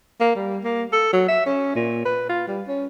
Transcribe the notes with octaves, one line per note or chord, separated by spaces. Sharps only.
A#3
G3
A#3
A4
F#3
E5
C#4
A#2
B4
F4
G3
C#4